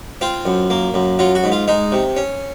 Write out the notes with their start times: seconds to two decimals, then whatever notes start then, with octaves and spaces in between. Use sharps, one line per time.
0.21 C4 F4
0.45 F#2
0.70 A#3
0.94 F#2
1.19 F#3 F4
1.35 F#4
1.44 G#2
1.52 F4
1.68 G#3 D#4
1.92 C3
2.16 C#4